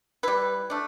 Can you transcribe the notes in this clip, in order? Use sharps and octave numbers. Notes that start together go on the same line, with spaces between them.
G3 E4 B4
A3 D4